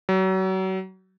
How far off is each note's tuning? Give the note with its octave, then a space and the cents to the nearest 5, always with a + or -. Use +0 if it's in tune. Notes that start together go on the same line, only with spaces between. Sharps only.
F#3 +35